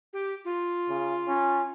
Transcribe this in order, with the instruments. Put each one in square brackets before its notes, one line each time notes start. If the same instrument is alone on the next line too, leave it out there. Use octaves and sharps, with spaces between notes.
[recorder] G4
F4
[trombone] C#3
C#4